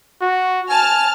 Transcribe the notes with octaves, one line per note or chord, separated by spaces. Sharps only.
F#4
G#5 A5 F6